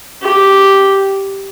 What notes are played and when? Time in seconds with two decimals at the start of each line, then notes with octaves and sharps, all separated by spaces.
0.22 G4